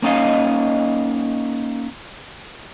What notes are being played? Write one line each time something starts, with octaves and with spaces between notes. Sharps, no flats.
A#3 C#4 D#4 D#5 F5